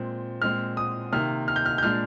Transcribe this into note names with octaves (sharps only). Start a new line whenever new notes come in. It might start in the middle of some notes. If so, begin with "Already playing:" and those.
Already playing: A#2 G#3 C4
A#2 G#3 C4 F6
D#6
C3 D#3 A#3 F6
F6
G6
F6
G6
A#2 G#3 D4 F6